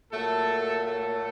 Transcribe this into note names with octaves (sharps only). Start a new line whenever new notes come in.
A#2 F#3 A3 A#3 A4
A3 A4